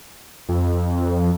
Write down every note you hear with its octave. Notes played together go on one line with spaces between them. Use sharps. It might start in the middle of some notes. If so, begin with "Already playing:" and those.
F2